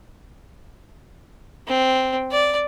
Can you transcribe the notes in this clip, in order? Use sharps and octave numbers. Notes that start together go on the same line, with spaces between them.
C4
D5